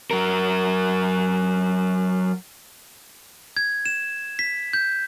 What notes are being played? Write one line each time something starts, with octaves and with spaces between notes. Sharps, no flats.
F#3 A#4
G#6
E7
B6
G6